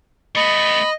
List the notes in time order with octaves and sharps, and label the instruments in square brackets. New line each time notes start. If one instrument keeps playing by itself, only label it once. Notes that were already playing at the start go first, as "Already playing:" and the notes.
[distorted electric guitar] A3 B3 [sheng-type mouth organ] D#5 [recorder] B5